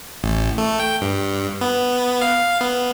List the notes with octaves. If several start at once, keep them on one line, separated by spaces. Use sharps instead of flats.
A1
A3
G5
G2
B3
F5
B3